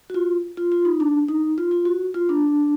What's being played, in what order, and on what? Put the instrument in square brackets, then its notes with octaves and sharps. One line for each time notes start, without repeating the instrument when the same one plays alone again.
[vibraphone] F#4
F4
F4
F4
D#4
D4
D#4
F4
F4
F#4
F4
D4